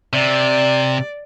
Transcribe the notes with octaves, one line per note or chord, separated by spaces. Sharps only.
C3 D5